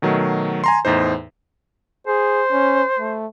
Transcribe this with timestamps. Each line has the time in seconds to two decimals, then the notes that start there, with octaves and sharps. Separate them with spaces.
0.02 B2 D#3 F#3 A3
0.64 G#5 A#5 C6
0.85 E2 A2 D#4 C5
2.07 G#4 C5
2.52 C#4
2.99 A3